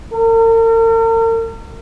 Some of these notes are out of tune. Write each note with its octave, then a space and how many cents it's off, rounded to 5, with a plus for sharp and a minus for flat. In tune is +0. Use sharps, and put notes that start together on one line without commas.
A#4 -45